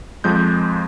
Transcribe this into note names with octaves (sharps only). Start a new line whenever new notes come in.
F2 F3 G#3 G6